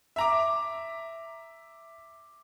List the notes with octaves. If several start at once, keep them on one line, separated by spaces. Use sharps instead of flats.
E5 A#5 D6